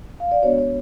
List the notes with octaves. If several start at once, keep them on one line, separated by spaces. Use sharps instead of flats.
F5
D5
G#3 B3 D4 F#4 C#5
C#5